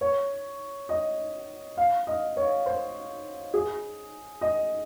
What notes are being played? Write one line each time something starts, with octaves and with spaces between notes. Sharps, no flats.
C#5
D#5
F5
D#5
C#5
C5
G#4
D#5